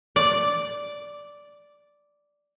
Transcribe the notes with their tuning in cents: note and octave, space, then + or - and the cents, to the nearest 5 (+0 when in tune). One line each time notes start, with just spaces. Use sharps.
D5 -5